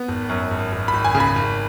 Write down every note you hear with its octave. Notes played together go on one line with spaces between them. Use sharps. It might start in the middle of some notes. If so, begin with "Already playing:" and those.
Already playing: B3
G#1
F#2
G#1
G#1
B5
G#1
G#5
C#3
B5
G#1